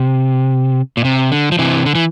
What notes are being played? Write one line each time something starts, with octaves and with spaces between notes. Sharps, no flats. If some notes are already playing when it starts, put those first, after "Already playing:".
Already playing: C3
A#2
C3
D3
F3
C3 E3
D3
E3